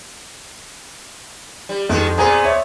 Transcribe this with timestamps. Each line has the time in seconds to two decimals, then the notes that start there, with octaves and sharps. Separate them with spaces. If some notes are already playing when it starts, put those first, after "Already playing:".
1.69 G3
1.89 F2 D#3 G#3
2.17 A#2 B3 C4 G#4 A#5
2.44 C#5 E5